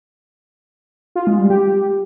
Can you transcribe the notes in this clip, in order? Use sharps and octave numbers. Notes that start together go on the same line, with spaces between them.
F4
G#3
G3
G4